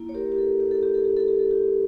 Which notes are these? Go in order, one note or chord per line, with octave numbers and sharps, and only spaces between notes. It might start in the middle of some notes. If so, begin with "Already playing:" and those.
Already playing: A#3 E4
C#5
G4 A#4
G4
A4
G4
A4
G4
A4
G4
A4
G4
A4
G4